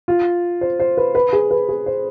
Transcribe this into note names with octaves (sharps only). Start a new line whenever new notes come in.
F4
C5
C5
B4
B4
G#4
B4
G#4
C5